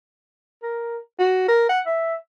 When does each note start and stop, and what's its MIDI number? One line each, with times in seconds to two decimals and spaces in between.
0.63 0.98 70
1.19 1.43 66
1.48 1.67 70
1.69 1.80 78
1.86 2.14 76